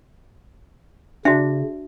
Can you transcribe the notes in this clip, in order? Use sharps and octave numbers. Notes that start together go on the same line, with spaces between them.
C#3 D4 F#4 E5